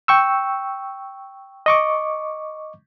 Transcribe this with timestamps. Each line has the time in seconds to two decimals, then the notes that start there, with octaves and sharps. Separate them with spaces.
0.08 G5 C#6 E6
1.66 D#5 C#6 D6